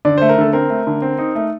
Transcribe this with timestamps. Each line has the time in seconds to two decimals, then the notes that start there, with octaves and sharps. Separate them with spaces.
0.05 D3 D5
0.18 A3 C5
0.29 A#4
0.38 D3 A4
0.53 C4 A#4
0.70 A3
0.87 D3
1.02 C4
1.18 D#4
1.35 A3